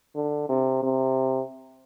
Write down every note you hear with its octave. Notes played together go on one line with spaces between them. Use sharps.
D3
C3
C3